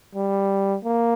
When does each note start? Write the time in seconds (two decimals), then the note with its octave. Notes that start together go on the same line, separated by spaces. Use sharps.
0.15 G3
0.85 A#3